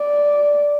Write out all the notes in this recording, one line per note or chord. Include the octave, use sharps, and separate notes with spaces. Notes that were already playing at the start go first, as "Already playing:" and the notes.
Already playing: D5